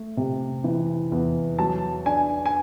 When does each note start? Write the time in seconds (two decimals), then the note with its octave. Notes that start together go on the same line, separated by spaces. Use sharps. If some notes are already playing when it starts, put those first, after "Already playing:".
Already playing: A3
0.17 C3
0.64 E3
1.12 E2
1.59 F#3 A5
2.06 D4 G#5
2.46 G#5